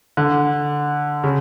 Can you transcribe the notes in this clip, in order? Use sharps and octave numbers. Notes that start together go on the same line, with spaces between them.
D3
C#3